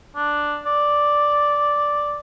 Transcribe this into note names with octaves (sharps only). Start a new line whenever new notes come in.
D4
D5